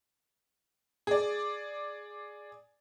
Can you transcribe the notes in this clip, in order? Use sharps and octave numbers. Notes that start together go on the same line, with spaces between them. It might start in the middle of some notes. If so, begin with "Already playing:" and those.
G#4 D5